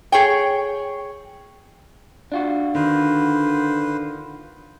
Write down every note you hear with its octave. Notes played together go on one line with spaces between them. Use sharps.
G#4 C#5 G5
D4 F4 F#4
D3 D#3 B4 C5